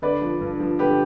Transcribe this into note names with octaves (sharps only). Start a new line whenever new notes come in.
D3 B4 D5
F3
G2
F3
D3 G4 B4